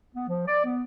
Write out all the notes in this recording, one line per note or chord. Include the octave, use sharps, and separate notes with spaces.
B3
F3
D5
B3